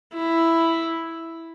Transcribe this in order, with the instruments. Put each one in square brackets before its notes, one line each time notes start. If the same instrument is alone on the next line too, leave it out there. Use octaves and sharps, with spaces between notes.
[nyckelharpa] E4